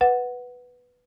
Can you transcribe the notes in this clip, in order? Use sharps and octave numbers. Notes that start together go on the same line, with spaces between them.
B4 F#5